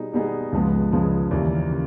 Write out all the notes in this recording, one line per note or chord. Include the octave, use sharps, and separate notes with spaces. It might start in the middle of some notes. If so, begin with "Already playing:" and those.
Already playing: B2 G3 B3 D#4 G#4
B2 G3 B3 D#4 G#4
C#2 C#3 F3 G#3 B3
C#2 C#3 F3 G#3 B3
D#2 C#3 E3 G3 A#3
C#3